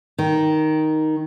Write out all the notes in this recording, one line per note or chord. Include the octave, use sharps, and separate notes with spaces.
D#3